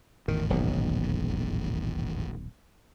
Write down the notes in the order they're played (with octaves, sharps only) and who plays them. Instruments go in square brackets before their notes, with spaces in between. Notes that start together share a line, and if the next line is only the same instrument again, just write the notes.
[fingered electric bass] G#1 E2 A2 [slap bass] D#3
[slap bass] D#1 B1 B2